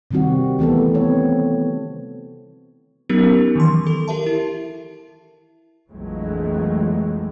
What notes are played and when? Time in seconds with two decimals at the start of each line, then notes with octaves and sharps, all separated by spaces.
0.11 C3 D#3 G3 C4 F#4
0.59 E3 A3 B3 A4
0.95 C4 C#5
3.09 F#3 B3 C#4 D#4 G4 A#4
3.55 D#3 E3 C6
3.87 A4
4.08 G4 A#4 E5 A5
4.26 E4
5.90 A#1 F2 E3 F#3 G#3 A3